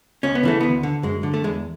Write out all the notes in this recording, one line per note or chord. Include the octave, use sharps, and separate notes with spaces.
C#2 C#4
B3
C#3 E3 A3
D2 B3
D3
F#2 G#3
D3
A3
E2 G#3